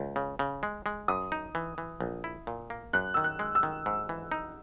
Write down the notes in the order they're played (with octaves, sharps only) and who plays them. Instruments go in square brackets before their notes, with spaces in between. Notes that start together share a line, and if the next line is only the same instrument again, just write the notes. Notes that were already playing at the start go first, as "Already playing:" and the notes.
Already playing: [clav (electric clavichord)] C#2
C#3
C#3
G#3
G#3
[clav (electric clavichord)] F#2 [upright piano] D#6
[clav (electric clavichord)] D#4
E3
E3
A#1
E4
A#2
A#3
[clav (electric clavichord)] F#2 [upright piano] F#6
[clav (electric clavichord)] D#3 [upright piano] E6
[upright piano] F#6
[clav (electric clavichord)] G#3
[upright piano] E6
[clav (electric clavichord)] D#3
G#2
E3
D#4